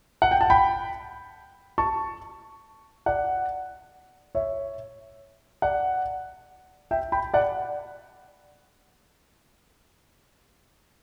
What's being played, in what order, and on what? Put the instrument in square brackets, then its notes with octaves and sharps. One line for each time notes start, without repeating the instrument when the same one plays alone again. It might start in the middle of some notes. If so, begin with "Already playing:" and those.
[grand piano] F#5
G5
A5
G5 B5
A5 C#6
D5 F#5
C#5 E5
D5 F#5
E5 G5
G5 B5
D5 F#5